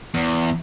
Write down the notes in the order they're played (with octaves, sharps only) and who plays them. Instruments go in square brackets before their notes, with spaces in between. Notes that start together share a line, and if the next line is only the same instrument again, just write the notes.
[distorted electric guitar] E2